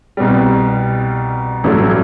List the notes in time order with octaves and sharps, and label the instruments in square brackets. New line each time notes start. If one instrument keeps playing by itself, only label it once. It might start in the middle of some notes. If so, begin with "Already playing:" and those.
[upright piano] C2 B2 G3
A1 G2 F#3 A3 E4